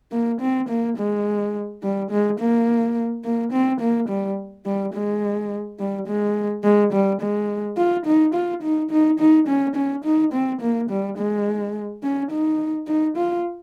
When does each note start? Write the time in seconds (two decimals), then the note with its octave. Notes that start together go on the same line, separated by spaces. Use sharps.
0.12 A#3
0.41 C4
0.69 A#3
0.97 G#3
1.83 G3
2.10 G#3
2.39 A#3
3.24 A#3
3.52 C4
3.80 A#3
4.09 G3
4.66 G3
4.94 G#3
5.79 G3
6.07 G#3
6.64 G#3
6.93 G3
7.21 G#3
7.77 F4
8.06 D#4
8.34 F4
8.63 D#4
8.91 D#4
9.19 D#4
9.48 C#4
9.76 C#4
10.05 D#4
10.33 C4
10.61 A#3
10.90 G3
11.18 G#3
12.03 C#4
12.31 D#4
12.87 D#4
13.17 F4